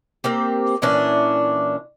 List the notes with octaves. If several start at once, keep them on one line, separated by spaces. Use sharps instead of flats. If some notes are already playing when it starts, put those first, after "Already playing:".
A#3 C4 G4
A#2 E3 C#4 D4